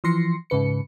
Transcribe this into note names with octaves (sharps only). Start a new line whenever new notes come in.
E3 F3 C6 A#6 C7 C#7
G#2 C#3 B4 C#7